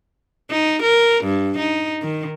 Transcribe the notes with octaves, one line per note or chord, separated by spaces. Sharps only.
D#4
A#4
G2
D#4
D#3